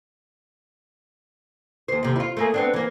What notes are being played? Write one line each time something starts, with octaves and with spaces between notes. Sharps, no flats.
D#2 C5
D#2 C3
E4 F4
A3 A#3 G#4
B3 C4 D4
E3 A#3